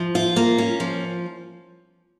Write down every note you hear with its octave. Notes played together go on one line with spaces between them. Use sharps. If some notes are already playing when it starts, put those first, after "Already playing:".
Already playing: F3
F4
A#3
C#4
F3